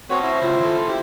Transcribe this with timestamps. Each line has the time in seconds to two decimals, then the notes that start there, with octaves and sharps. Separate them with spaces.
0.10 C4 F#4 B4 C#5 A5
0.23 E4 C5
0.41 C#2 F4
0.60 D#2 A4
0.88 E4 F4 G4